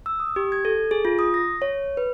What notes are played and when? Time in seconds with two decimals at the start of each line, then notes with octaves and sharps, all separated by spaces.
0.06 E6
0.20 D#6
0.36 G4
0.52 G#6
0.65 A4
0.91 G#4
1.05 F4
1.19 D#6
1.34 A#6
1.62 C#5
1.97 B4